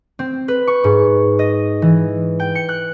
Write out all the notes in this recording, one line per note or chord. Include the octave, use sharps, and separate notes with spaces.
C4
B4
C#6
G#2
D#5
E3
G5
C#7
F#6